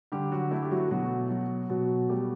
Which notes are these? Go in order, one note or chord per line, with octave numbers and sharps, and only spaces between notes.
D3 G3 G4
F#3 F#4
A3 E4
G4
F#3 F#4
B2 F#3 F#4
F#3
B2 F#3 F#4
G3 A3 G4